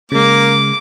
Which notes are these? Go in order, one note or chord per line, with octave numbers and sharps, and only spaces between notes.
C#3 G#3 A#3 D6